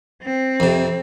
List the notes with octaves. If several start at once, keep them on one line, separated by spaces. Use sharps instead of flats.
C4
F2 C3